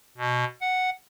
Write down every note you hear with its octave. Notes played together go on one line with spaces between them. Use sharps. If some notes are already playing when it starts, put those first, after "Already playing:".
B2
F#5